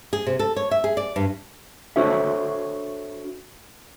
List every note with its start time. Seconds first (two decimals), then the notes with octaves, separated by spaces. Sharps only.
0.13 G#4
0.27 C3
0.39 A4
0.56 C#5
0.71 E5
0.84 G#4
0.97 D5
1.16 G2
1.96 D4 F#4 A4 C5 C#5 E5